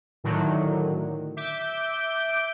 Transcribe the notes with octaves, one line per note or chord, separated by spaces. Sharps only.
A2 D3 D#3 F#3
E5 D6 G6 D7